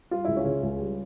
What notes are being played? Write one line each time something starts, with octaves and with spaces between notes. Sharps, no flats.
G3 F4
C#2 E4
C#4 F4
C#3
C#2
G3